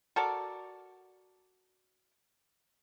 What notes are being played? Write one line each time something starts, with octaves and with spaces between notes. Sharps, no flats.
F#4 A4 A#4 D5